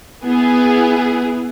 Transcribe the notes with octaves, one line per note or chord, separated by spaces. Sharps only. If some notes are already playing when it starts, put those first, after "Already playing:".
B3 E4 G#4